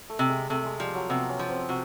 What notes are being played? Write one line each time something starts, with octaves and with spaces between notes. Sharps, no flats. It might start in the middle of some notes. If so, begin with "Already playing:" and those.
A3
C3
G#3
C3 A3
G#3
F3 G3
F#3
C3 B3
C#4
F3
C4
C3 F#4